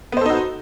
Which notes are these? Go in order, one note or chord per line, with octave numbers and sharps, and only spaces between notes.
B3 D#4 F#4 A4 C5